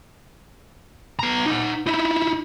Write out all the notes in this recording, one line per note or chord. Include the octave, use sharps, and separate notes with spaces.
B3 A#5
D#4 F#5
D#4 E4